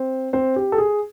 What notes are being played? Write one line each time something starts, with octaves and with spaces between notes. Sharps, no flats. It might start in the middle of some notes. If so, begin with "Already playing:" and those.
Already playing: C4 C5
C4 C5
G4
A4
G#4